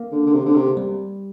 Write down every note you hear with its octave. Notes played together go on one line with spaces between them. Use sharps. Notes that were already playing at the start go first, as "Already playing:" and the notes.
Already playing: A#3
D3
D3
C3
D3
C3
G3